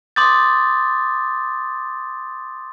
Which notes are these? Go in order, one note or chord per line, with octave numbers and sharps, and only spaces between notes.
C6 D6 D#6 G6 A6